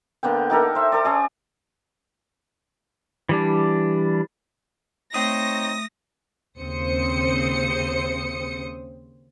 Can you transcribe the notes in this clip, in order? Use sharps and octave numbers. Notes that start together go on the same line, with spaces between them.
D3 A#3 B3 G5
D#4 G4 A4 A#4
C5 E5
A4 D5
C#4 G#4 D5
E3 G3 D4
A3 C4 D#4 C#5 D#6 A#6
D#2 C#3 C4 C5 D#6 C#7